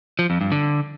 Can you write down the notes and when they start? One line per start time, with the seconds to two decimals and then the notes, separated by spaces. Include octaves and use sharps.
0.19 F3
0.30 F2
0.41 G2
0.52 D3